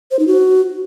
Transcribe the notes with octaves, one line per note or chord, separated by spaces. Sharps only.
C5
D#4
F#4